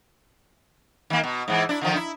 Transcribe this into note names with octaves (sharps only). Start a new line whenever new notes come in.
D#3 A#3
B2
G#2 E3
D4 E4
D3 D#3 F3
E4